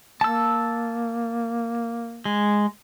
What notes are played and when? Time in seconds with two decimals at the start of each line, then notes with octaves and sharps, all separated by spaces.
0.21 A#3 A5 E6
2.25 G#3